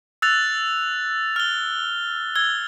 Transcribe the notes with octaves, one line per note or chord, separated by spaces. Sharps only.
E6 F#6 A6 F7
F6 G7
E6 G#6 G7